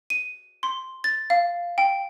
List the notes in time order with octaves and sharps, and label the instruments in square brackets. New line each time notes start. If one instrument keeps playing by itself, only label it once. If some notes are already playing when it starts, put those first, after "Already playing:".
[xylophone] D#7
C6
A6
F5
G5